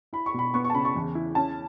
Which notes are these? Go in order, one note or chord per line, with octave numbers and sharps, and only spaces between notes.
E4 B5
C#6
B2 B5
B3 C#6
C#6
A5
C#3 B5
C#6
E2
E4
C#4 A5